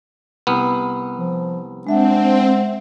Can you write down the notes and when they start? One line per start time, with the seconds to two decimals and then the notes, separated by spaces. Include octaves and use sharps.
0.47 C2 B3
1.17 F3
1.87 G#3 C4 D4 E5 F#5